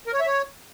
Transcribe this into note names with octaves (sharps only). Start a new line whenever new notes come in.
A#4
C#5
E5
C#5